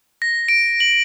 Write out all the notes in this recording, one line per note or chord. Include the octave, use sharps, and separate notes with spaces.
A#6
D7
F#7